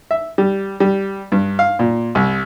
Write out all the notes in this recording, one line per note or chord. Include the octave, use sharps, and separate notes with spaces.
E5
G3
G3
G2
F5
A#2
C2